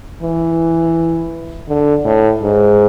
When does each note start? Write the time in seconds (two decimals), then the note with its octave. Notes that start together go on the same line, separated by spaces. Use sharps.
0.22 E3
1.69 D3
2.05 A2
2.42 G#2